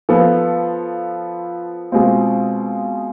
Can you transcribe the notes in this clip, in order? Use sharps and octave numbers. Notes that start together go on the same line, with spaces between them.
F3 B3 F4 A4
B2 G#3 C4 F4